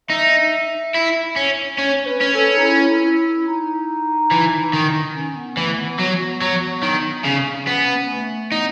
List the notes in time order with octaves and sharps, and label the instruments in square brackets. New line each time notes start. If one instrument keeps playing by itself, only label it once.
[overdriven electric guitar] D#4 [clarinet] E5
[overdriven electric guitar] E4
C#4
[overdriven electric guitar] C#4 [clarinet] C#5
[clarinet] B4
[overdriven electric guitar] C#4
[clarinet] A4
D#4
E4
E4
D#4
[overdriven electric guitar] E3
D#3
[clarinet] C#4
B3
[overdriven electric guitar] E3 [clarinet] A3
[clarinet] B3
[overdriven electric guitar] F#3 [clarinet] B3
[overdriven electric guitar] F#3
D#3
C#3
[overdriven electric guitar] B3 [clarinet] C#4
[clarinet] A3
[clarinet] B3 [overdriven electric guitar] D#4